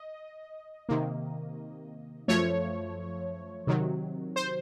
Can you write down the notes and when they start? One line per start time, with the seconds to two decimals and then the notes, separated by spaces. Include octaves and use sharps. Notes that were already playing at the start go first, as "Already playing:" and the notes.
Already playing: D#5
0.89 C3 D#3 A#3
2.28 F#2 F3 A3 C#5
3.67 C3 D#3 F#3
4.36 C5